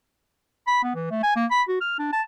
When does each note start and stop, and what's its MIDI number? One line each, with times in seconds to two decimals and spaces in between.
0.67 0.80 83
0.83 0.93 59
0.95 1.06 52
1.11 1.20 57
1.23 1.32 80
1.36 1.46 58
1.51 1.62 83
1.68 1.79 66
1.81 1.98 89
1.99 2.08 62
2.13 2.21 81